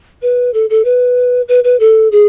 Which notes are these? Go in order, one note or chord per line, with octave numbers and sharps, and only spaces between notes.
B4
A4
A4
B4
B4
B4
A4
G#4